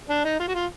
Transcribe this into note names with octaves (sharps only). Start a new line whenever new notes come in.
D4
D#4
F4
F#4
F4